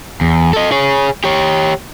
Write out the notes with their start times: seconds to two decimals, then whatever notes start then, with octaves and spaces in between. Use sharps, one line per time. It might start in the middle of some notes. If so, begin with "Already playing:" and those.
0.21 E2
0.53 A4 D#5
0.72 G#4 C#5
1.24 G4 C#5